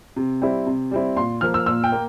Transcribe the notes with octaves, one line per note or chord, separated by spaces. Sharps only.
C3
G3 C4 E4
C3
G3 C4 E4
A#2 C6
F3 A#3 F6
E6
A#2 E6
G5
A#3